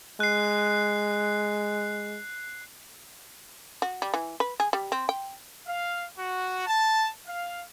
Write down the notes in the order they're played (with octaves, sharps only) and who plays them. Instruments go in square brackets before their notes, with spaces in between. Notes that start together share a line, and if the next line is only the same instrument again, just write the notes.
[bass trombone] G#3 [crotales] F#6 C7
[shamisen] F#4
G3
E3
B4
G#4
G3
C4
G5
[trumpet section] F5
F#4
A5
F5